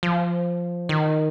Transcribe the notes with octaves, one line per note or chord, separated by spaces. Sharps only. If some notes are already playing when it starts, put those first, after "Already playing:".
F3
D#3